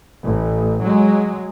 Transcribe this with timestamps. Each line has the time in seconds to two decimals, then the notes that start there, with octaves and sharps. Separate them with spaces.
0.24 A1
0.82 F#3 G#3